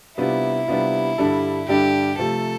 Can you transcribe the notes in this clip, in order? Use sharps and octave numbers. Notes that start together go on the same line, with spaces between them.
C3 G3 B3 D4 E4 F4
C3 G3 B3 D4 F4
G2 D3 G3 D4 A4
G2 D3 G3 D4 G4 A4
C3 F3 A3 A4